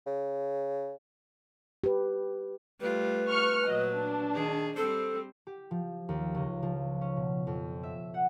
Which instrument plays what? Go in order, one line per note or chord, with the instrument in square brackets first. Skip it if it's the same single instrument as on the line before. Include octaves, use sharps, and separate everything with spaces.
[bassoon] C#3
[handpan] G4 B4
[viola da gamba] G3 A3 F4 [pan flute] B4
[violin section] C#6 F6 C#7
[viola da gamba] A#2 F#3 [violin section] D#5
[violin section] D4
[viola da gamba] D#3 G#4
[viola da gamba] G3 C4 C5 [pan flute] A4
[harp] G4
F3
D#2
C#2
F3
C#4
B2
F2
E5
F#5